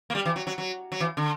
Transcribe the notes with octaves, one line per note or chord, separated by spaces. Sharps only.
A#3
G3
E3
F#3
F#3
F#3
F#3
E3
D3